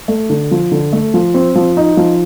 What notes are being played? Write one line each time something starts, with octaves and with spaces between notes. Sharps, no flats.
A3
D3
F3
D3
A3
F3
C4
F3
D#4
F3